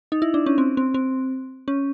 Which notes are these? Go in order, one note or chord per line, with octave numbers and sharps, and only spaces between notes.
D#4
E4
D4
C#4
C4
C4
C4
C#4